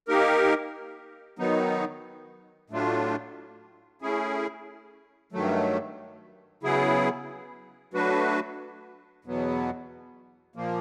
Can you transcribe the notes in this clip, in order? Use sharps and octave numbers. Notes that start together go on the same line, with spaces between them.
A#3 D#4 G4 A#4
D#3 F#3 B3 D#4
A2 F#3 A3 D4 F4
A3 C#4 E4 G#4
G2 D#3 F#3 A3
C#3 F#3 B3 E4 G#4
F#3 A3 D4 F#4 B4
E2 B2 F#3 B3
A#2 F3 A#3